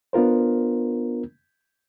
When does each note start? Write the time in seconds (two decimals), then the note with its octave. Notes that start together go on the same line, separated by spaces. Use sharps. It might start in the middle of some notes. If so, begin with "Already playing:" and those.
0.13 B3 D4 F4 A#4 C5